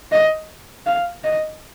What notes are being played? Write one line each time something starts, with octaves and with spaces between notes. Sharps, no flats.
D#5
F5
D#5